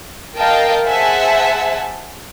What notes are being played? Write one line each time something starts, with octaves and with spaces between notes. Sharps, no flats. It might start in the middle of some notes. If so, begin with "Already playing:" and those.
A#4 D#5 F5 G5 A5
G#4 C5 E5 F#5 G#5 A5